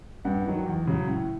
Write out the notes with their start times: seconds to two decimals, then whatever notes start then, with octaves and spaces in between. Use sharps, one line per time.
0.25 G2 F#5
0.46 D#3 F#3
0.66 E2
0.87 C#3 F#3
1.08 A2